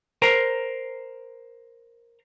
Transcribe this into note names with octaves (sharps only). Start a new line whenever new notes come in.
A#4 C5 A#5